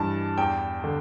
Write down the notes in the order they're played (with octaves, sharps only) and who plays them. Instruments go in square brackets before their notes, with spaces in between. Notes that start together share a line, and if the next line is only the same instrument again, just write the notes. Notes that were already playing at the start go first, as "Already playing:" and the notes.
Already playing: [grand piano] G2 E3 A5
E2 G5
D3